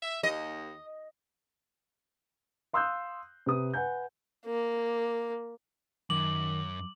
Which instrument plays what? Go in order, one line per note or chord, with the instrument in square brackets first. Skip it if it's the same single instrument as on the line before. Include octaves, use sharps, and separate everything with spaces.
[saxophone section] E5
[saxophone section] D#2 [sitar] D#5
[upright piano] F5 C6 D#6 E6 F#6 G6
C3 B4 D#6
B4 F#5 G#5 G6
[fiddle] A#3
[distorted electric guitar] F#2 [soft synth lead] D#3 [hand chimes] D6 [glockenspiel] F#7